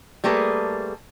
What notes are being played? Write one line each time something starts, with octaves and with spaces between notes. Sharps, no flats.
G3 A3 A#3 G#4 A4 B4